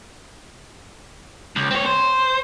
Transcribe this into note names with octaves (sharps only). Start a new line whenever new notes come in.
C#2
C4 C#5
C5